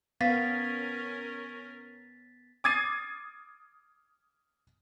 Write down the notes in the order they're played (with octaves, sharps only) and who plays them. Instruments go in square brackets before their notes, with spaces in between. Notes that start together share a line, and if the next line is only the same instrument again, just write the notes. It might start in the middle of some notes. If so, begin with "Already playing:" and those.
[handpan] B3 [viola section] C#4 A#4 [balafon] F5 [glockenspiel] A6 B6
[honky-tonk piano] D6 D#6 G#6 A6 C7 D#7